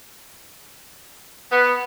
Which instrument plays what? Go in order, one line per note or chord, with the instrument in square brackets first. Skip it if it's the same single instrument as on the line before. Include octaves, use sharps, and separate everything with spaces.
[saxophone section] B3